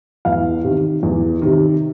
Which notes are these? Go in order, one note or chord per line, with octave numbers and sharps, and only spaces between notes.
E2 F5
C3 D#3
E2
C3 D#3